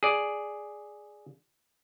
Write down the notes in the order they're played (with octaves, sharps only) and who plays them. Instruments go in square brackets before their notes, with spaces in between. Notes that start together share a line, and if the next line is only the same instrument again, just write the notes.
[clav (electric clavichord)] G#4 D5